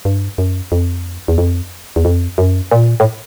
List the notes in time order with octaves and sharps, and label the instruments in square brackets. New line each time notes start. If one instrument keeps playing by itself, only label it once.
[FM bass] G2
F#2
F2
E2
F2
E2
F2
F#2
A#2
A2